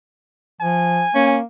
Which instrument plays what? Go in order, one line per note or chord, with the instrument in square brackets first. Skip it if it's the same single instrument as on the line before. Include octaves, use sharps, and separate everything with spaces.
[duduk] F3 [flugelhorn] G#5
[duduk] A#3 [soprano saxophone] C#4